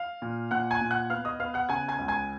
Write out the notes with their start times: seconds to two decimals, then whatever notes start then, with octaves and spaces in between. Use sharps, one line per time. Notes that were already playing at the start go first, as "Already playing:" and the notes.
Already playing: F5 F6
0.22 A#2
0.51 A#2 F#5 F#6
0.71 G#5 G#6
0.81 A#2
0.91 F#5 F#6
1.10 B3 F5 F6
1.25 D#5 D#6
1.40 B3 F5 F6
1.54 F#5 F#6
1.69 C#3 G#5 G#6
1.88 G#5 G#6
1.98 C#2
2.08 G#5 G#6